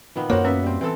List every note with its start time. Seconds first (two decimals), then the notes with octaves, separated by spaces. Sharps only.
0.16 A#2 D#3 B3
0.30 F#2 A#3 F#4 A#4 C5 C#5 F#5
0.45 B3 C#4 E5
0.63 G3 C4
0.81 E3 C4 A4